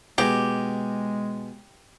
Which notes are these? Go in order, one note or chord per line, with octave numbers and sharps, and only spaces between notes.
B2 G#3 G4 G#4 A#5